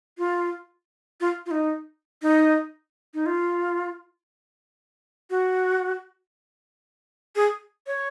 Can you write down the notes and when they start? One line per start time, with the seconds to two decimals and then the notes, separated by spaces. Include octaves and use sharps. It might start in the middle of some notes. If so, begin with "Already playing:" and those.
0.18 F4
1.21 F4
1.46 F4
1.51 D#4
2.22 D#4
3.14 D#4
3.26 F4
5.30 F#4
7.36 G#4
7.87 C#5